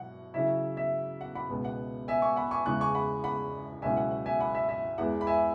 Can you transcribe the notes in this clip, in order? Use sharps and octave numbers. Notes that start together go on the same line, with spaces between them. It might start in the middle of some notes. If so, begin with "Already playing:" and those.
Already playing: B2 F#3 F#5
C#3 F#3 E4 E5
E5
F#5
F#5 B5
C#2 B2 B3
F#5
E5 G#5
G#5 C#6
F#5 B5
G#5 C#6
E2 C#3 G#3 C#6 F#6
G#5 C#6
F#5 B5
F#5 B5
C#2 B2 F#3 C#4 E4 E5 G#5
F#5
F#5
E5 G#5
F#5 B5
E5
E5
E2 E3 G#3 B3 F#5
B5
E5 G#5